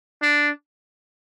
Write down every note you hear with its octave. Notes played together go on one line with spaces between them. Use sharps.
D4